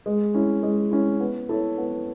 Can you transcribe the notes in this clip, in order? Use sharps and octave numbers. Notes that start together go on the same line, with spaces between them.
G#3
C#4 E4
G#3
C#4 E4
B3
E4 A4 C#5
B3